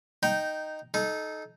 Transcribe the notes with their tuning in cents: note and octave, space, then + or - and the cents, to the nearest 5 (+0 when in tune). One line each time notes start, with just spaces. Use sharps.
D#4 -5 G5 -10 A#5 +0
D#4 +0 A4 -25